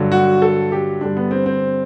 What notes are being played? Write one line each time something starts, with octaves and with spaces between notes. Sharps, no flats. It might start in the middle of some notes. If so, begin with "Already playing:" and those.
Already playing: G2 D3 F#3
F#4
A4
G4
G2 D3 G3 D4
B3
C4
C4